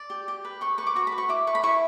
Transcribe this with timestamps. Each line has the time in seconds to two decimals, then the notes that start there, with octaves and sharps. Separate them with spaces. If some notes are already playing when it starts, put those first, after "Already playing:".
Already playing: D5
0.10 G4
0.28 G4
0.45 B4
0.61 G4 C#6
0.78 B4 C#6
0.87 D6
0.96 F#4 C#6
1.07 B5
1.12 B4
1.18 C#6
1.29 E4 D6
1.47 B4 C#6
1.55 B5
1.63 E4 C#6